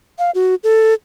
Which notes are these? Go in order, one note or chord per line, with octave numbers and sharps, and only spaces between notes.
F5
F#4
A4